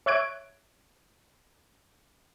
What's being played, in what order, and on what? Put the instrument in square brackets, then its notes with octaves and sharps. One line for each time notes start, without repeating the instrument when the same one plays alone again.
[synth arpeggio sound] C#5 E5 C#6 F#6 G#6 D7